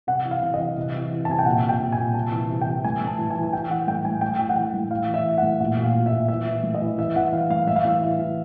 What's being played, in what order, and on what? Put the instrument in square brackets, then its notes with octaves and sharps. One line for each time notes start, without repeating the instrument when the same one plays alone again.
[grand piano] C3 F#5
E3
F5
C3
D#5
E3
C3
E3
E3
A5
C3 G#5
G5
A#2 F#5
A#2
G5
A#2
G#5
A#2
C3 A5
E3
C3
E3 G5
A2 G#5
A2
A5
E3
G#5
E3
G#5
E3 G5
E3 F#5
A2 G5
A2 G#5
A2 G5
E3 G5
F#5
E3 G5
A2
E3 F5
E3
E5
E3
F#5
A2
A#2 F#5
A#2
F5
A#2
E5
A#2
E3 E5
E3
A2
D#5
E3
E3 E5
E3 F#5
E3 F5
A2 F5
A2 E5
F5
E3 E5
E3
E3